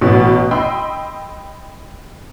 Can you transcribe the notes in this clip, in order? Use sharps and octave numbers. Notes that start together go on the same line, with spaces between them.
A1 B2
D#5 G5 B5 C6 E6